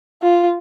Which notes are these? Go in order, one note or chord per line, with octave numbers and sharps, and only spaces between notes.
F4